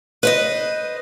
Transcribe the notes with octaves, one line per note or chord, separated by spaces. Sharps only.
B4 C5 D#5